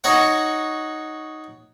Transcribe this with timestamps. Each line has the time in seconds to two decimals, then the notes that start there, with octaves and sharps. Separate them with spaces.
0.04 D#4 F#4 C#5 F#5